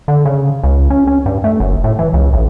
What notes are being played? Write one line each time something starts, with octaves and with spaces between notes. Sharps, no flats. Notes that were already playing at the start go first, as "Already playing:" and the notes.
D3
C#3
C#2
C#4
C#4
G2
A3
F#1
A2
E3
C#2
A1